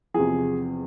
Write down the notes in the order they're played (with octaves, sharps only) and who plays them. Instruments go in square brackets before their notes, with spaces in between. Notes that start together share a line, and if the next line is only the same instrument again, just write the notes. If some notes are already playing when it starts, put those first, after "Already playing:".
[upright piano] E2 C3 F3 G#4